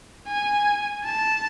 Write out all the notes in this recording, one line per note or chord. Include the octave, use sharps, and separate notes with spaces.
G#5
A5